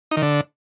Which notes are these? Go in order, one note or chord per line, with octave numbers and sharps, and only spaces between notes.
D#4
D#3
D3